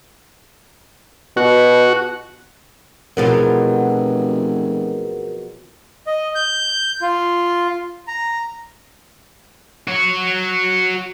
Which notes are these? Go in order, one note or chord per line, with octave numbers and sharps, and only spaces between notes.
B2 F#4
F1 B2 F3 F#3 G#4 A#4
D#5
G6
F4
A#5
F#4 C#5